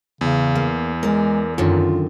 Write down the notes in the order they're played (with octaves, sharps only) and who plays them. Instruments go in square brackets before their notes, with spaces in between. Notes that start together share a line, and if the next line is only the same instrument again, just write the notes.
[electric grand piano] E2 [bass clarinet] C#3
[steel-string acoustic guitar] A#3
[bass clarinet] G#3 [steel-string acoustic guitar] A#4 D5
[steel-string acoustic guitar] F#2 D3 D#3 [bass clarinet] F4